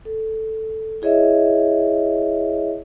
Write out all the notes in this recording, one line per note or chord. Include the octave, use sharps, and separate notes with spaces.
A4
E4 G#4 C#5 D#5 E5